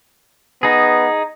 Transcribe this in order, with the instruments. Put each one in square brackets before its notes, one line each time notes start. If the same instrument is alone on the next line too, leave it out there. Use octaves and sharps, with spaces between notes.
[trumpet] B3 [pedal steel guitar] D#4 G#4